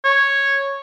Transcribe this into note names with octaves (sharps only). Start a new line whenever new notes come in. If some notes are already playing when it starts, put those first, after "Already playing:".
C#5